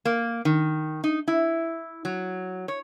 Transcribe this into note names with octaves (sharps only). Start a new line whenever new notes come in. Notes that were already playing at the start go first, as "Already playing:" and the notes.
A#3
D#3
D#4
E4
F#3
C#5